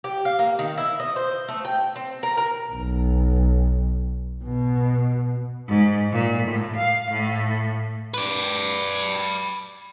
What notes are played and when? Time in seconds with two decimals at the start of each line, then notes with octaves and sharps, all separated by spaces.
0.04 G4
0.25 F5
0.39 A#3
0.59 D#3
0.78 E4
1.00 D#5
1.16 C5
1.49 A3
1.65 G5
1.96 C4
2.23 A#4
2.37 A#4
2.72 B1
4.44 B2
5.68 G#2
6.12 A#2
6.48 A2
6.76 F5
7.11 A2
8.14 B4 D5